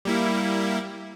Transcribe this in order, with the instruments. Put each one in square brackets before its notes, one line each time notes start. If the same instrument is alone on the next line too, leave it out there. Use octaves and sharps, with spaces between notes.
[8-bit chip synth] G3 A#3 E4